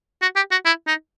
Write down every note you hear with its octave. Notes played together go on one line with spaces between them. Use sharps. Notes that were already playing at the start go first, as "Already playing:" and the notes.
F#4
G4
F#4
E4
D#4